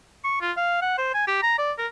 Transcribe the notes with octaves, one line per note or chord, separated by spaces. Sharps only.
C#6
F4
F5
F#5
C5
G#5
G4
A#5
D5
A#4